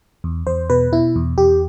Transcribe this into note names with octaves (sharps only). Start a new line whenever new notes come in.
E2
E2 C5
B2 B4
B2 E4
E2
E2 G4